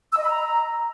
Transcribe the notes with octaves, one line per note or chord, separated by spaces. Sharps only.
E6
D#5
B5
A#5